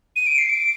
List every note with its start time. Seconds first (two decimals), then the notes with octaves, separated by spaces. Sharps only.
0.16 D#7
0.27 D7
0.38 C7
0.49 D7